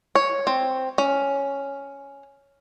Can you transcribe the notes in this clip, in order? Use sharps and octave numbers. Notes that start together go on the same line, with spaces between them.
C#5
C4
C#4